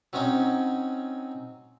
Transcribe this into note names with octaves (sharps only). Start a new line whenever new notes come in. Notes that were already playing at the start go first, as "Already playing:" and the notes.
F#3 C4 C#4 D#4 C#5